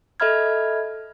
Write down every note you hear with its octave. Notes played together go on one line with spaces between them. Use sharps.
A4 D#5 E5 B5 F6 G#6